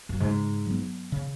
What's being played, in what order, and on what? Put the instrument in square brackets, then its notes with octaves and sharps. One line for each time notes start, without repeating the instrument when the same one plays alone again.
[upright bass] F#2
[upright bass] G#2 [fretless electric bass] C#3
[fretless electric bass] F#3 B3
C#3